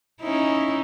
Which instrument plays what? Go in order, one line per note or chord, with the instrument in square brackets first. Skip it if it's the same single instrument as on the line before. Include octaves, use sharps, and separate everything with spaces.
[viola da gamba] C#4 D#4 E4